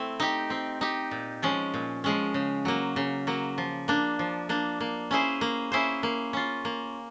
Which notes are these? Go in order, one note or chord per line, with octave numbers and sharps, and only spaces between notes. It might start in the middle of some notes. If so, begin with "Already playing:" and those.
Already playing: A3 C4 E4
D#4 G4
C4
D#4 G4
A#2
F3 G#3 C#4
A#2
F3 G#3 C#4
C#3
F#3 A#3
C#3
F#3 A#3
F3
A#3 D4
F3
A#3 D4
A#3
C#4 E4 G#4 C5
A#3
C#4 E4 G#4 C5
A#3
C#4 F4
A#3